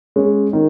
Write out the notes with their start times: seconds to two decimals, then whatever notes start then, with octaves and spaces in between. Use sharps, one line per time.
0.16 G#3 C#4
0.53 D#3